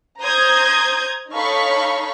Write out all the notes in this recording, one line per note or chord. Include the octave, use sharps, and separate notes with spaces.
C5 A#5 D#6 G6 G#6
D#4 A4 C#5 F5 B5 C#6